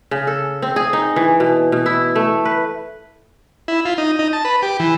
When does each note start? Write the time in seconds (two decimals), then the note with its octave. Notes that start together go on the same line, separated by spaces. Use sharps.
0.11 C#3
0.27 A4
0.62 C4
0.76 G#4
0.93 D#4
1.16 E3
1.40 B2
1.72 B2
1.86 E4
2.16 A3
2.45 B4
3.68 E4
3.85 F4
3.98 D#4
4.19 D#4
4.33 A5
4.45 B4
4.63 G4
4.80 E3